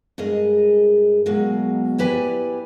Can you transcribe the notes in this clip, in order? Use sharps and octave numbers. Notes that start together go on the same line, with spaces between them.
G2 G#3 G#4 A#4 D#5
B2 F#3 G#3 A#3
E4 G4 B4 D5 G#5